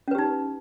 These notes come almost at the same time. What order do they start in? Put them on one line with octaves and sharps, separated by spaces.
C#4 B4 G4 D#4